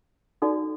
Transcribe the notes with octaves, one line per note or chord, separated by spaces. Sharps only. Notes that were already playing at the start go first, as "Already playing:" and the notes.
D#4 F#4 A4 D5